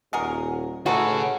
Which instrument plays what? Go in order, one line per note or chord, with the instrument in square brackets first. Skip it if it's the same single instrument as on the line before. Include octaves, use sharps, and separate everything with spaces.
[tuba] D#1 [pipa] F#4 G#4 A#4
[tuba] A2 [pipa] E3 D#4 A4 [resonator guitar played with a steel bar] F#4 [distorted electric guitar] G#4 C#5